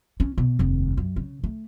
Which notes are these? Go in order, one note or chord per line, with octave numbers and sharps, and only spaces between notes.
C#4
B2
F1 D#2
F#2
C#3
A3